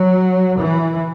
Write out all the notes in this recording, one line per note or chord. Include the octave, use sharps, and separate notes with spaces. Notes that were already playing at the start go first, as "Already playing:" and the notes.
Already playing: F#3
E3